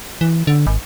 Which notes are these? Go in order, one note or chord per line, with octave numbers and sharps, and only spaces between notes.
E3
D3
G#1